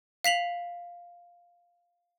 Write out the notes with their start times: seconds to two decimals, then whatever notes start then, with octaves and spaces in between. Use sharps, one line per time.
0.24 F5 B6 F7 F#7